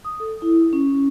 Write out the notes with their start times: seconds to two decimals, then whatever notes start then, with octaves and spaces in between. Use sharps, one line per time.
0.05 D#6
0.20 A4
0.42 E4
0.73 C#4